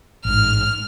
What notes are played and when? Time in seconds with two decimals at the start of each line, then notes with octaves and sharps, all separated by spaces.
0.25 A1 G#2 F6